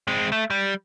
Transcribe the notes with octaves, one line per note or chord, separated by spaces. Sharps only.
G#3 C4
A3
G3